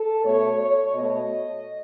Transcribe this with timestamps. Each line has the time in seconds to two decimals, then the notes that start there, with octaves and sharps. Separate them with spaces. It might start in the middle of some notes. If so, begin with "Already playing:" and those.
Already playing: A4
0.24 B2 A3 C#5
0.60 C#5
0.95 B2 A3 D#5